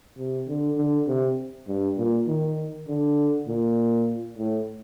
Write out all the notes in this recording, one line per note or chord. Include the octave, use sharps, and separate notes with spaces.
C3
D3
D3
C3
G2
A#2
D#3
D3
A#2
A2